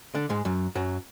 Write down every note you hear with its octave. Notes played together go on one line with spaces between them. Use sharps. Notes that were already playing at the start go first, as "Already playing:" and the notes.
D3 D4
G#2 G#3
F#2 F#3
F#2 F#3